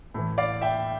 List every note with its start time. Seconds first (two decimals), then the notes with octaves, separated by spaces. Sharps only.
0.14 A2 E3
0.38 D5 F5
0.62 E5 G5